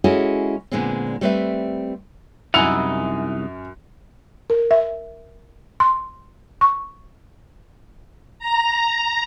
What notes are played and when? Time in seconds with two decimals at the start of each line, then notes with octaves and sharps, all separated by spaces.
0.04 G#3 C#4 E4 F#4 G#4 A4
0.72 A#2 D3 G#3 B3 C4
1.21 G3 A3 C4 B4 C#5 E5
2.54 C2 F#2 D#4 E4 F#5 G#5 F7
4.50 A#4
4.71 E5
5.80 C6
6.61 C#6
8.39 A#5